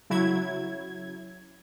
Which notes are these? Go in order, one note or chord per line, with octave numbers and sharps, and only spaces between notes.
C#3 F#3 E4 G#6